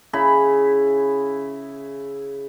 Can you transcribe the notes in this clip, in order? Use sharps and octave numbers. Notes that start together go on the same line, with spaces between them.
C#3 E4 B5